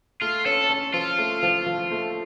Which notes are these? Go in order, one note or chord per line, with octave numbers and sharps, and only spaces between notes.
A3 F4
C#4 A4
C#4
F3 F4
A3
F3
F3
A3